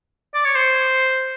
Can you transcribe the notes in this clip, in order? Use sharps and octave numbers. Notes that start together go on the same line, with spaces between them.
D5
C#5
C5